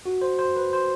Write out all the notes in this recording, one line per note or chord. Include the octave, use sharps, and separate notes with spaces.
F#4
C5
C5
B4
C5